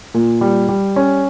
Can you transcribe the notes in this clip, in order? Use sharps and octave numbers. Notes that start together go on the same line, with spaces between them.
A#2
G3
G3
C#4